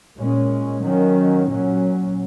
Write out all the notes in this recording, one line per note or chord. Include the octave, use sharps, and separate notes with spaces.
A#2 G#3 C#4
D#3 F#3 C#4
A#2 F#3 C#4